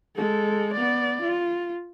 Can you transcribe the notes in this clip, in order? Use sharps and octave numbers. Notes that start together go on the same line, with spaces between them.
G#3 A4
B3 D5
F4